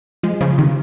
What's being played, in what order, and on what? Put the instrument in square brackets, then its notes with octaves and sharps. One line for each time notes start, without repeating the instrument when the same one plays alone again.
[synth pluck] F3 G#3
C#3 F3
C3 D#3